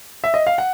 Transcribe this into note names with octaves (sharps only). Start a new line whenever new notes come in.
E5
D#5
F5
F#5